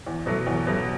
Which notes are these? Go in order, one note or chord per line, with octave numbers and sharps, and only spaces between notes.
E2
B2 F#3 A3
E2
B2 F#3 A3